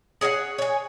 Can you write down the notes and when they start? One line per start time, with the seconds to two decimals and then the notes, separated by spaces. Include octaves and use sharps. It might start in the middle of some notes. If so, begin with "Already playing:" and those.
0.21 G#4 C#5 E5 F#5
0.58 C#5 G#5